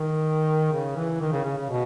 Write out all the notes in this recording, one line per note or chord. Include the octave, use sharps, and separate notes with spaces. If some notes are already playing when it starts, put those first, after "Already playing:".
Already playing: D#3
C#3
E3
D#3
C#3
C#3
C#3
B2